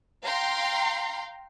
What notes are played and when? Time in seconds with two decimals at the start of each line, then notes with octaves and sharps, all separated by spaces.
0.24 F5 G5 A#5 C6